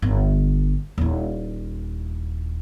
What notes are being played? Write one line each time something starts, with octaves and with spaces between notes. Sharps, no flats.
G1
D#1 E4